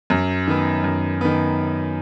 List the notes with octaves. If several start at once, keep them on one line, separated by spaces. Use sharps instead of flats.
F#2
D#3 B3
F#2
D#3 B3